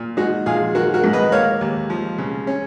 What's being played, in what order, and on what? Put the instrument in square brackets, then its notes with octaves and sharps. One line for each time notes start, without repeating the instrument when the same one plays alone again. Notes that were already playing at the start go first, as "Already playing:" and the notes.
Already playing: [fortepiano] A#2
G#3 D#4 F#4
A#1 F4 G#4
D#3 F#4 A#4
F#4 A#4
G#2
B4 D#5
A#3 C#5 F5
D#2
F3
C#3
C#4